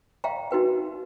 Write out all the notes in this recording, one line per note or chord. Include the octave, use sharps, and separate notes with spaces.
E5 F5 G5 A#5
D#4 F#4 B4 G5